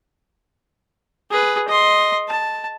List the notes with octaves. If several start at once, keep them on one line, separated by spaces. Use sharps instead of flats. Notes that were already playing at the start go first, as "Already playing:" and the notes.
G#4 B4
D#5 C6
A5